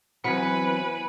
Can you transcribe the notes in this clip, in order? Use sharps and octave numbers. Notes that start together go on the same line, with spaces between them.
E3 F#3 B3 C4 B4 G#5 B6 C#7